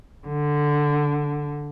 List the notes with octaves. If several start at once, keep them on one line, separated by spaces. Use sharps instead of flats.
D3